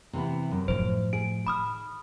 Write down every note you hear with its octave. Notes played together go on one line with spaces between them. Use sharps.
C3 E3 B3
F#2
A2 F3 C5
G#4 D7
D#3 B5 D#6 F6